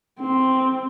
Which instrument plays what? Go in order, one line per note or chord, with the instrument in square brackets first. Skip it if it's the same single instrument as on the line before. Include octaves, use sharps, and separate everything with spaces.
[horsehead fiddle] C4